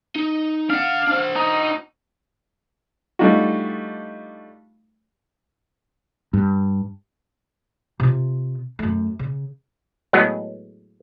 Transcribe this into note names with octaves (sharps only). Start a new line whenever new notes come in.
D#4
D4 F5 F#5
D4 C5
D#4
G3 A3 D4 D#4 F4 F#4
G2
C3 F4
F#2 A3
C#3
A2 F#3 G#3 B3